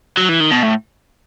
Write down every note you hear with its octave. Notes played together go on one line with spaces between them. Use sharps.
F#3
E3
D#3
B2
A2